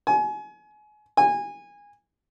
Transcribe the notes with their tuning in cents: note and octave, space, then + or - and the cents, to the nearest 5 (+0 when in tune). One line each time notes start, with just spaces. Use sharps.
G#5 +30
G#5 -20